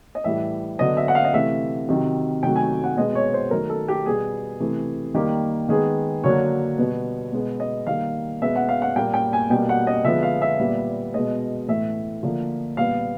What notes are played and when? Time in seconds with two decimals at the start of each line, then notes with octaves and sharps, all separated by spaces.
0.15 D#5
0.24 A2 E3 G3 E5
0.79 D3 F#3 B3 D#5
0.97 E5
1.08 F#5
1.15 F5
1.24 D#5
1.33 C3 E3 A3 E5
1.89 C3 D#3 F#3
2.43 C3 D#3 F#3 A3 G5
2.56 G#5
2.84 F#5
2.96 B2 G#3 B3 D#5
3.15 C#5
3.34 C5
3.51 D#3 F#3 A3 A#4
3.70 A4
3.88 G4
4.06 B2 G3 B3 G#4
4.60 C3 E3 A3
5.14 D#3 G3 A#3 G4
5.69 D#3 G#3 B3 G#4
6.24 D3 F#3 A#3 C#5
6.78 B2 G3 B3
7.32 B2 G#3 B3
7.60 D#5
7.87 D#3 G3 A#3 F5
8.42 B2 G#3 B3 E5
8.56 F#5
8.69 F5
8.82 F#5
8.95 A#2 G3 A#3 G5
9.14 G5
9.33 G#5
9.50 B2 G3 A#3 G5
9.69 F#5
9.87 D#5
10.04 D3 F3 G#3 B3 E5
10.23 F5
10.42 E5
10.59 A#2 G3 B3
11.14 B2 G#3 B3 D#5
11.68 A2 E3 A3 E5
12.23 D3 F3 A#3
12.77 A#2 G3 B3 F5